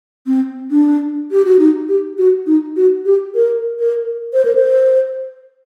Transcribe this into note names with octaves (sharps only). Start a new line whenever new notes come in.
C4
D4
G4
F#4
D#4
G4
F#4
D#4
F#4
G4
A#4
A#4
C5
A#4
C5